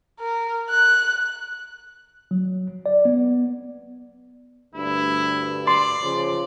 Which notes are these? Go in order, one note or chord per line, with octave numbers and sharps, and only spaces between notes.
A#4
F#6
F#3
D5
B3
D2 G2 E4
D5 C6
C#3 F3